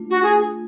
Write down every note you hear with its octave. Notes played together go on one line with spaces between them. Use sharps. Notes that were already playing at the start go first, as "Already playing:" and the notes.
Already playing: A3 D4 F4
F#4
G#4